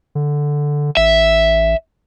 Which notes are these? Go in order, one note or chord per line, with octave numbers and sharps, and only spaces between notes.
D3
A1 E5